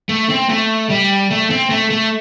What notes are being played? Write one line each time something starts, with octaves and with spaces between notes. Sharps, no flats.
A3
C4
A3
G3
A3
C4
A3
A3